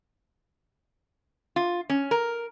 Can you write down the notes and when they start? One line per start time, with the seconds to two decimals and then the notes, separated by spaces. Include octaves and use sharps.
1.56 F4
1.90 C#4
2.11 A#4